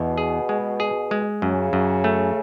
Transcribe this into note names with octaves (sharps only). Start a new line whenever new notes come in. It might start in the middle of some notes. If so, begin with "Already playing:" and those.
Already playing: E2 B2
G#4
G#3
G#4
G#3
F#2 C#3
F#2
A3